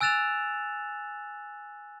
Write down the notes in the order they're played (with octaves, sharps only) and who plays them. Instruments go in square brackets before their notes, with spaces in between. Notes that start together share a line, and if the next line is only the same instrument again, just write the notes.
[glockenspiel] G#5 E6 F#6 A6 E7 F7